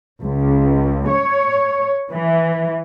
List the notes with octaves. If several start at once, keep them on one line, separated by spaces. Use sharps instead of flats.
C#2
C#5
E3